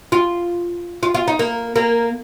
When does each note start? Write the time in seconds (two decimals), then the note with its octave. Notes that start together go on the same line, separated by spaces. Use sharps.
0.12 F4
1.03 F4
1.15 F4
1.28 D#4
1.39 A#3
1.76 A#3